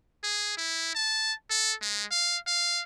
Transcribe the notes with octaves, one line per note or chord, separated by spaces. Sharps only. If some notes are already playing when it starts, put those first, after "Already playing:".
G#4
E4
A5
A4
G#3
F5
F5